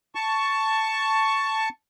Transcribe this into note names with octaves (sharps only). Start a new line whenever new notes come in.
A5 C#6